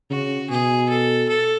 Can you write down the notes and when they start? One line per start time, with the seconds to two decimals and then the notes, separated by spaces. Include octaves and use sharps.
0.10 C#3 F#4
0.50 B2 G#4
0.89 A4
1.29 A4